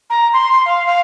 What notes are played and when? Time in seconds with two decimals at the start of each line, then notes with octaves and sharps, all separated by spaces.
0.10 A#5
0.33 C6
0.53 C6
0.66 F5
0.87 F5